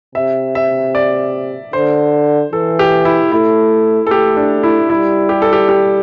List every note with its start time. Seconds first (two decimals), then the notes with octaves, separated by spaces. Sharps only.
0.15 C3 E5
0.55 E5
0.95 D5
1.73 D3 C5
2.53 E3 A4
2.79 G4
3.05 E4
3.32 A3 E4
4.07 A4
4.11 A3 G4
4.37 D4
4.63 E4
4.90 G3 E4
5.29 G4
5.42 A4
5.53 G4
5.69 G4